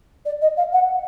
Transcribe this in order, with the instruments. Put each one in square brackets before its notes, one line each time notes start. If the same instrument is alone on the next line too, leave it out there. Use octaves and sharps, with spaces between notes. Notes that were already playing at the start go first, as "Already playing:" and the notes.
[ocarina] D5
D#5
F5
F#5